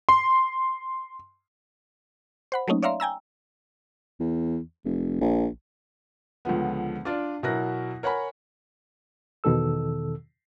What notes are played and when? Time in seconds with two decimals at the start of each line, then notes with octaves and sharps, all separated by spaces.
0.09 C6
2.52 C5 F#5 B5
2.68 F#3 A3 A#3 C#4 D#4
2.82 C#5 D5 E5 F5 A#5 C6
3.00 G5 G#5 A#5 E6
4.20 E2
4.84 F1
5.21 A#1
6.45 C#2 D3 F3 B3
7.05 D4 F4 D5
7.43 B2 F#3 E4 A#4 F#6 A#6
8.03 A#4 C#5 F#5 G#5 B5
9.44 E2 B2 D#3 A4 E6